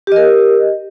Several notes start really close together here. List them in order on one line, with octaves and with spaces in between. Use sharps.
G4 D#5 A#4